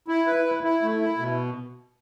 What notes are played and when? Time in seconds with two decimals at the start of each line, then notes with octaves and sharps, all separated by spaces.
0.08 E4
0.27 B4
0.45 E4
0.64 E4
0.82 A3
1.00 E4
1.18 B2